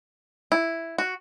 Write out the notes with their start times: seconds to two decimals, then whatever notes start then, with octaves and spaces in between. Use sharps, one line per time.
0.52 E4
0.98 F#4